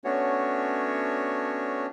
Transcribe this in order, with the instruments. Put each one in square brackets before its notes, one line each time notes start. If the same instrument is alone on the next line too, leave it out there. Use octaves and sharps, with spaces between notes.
[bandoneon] A3 B3 C#4 D4 F#4 C#5